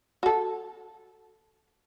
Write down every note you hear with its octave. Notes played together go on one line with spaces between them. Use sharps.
F#4 A4